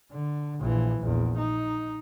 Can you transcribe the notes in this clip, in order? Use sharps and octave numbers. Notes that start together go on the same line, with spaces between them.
D3
A#1 E3
A#1 E2
D#4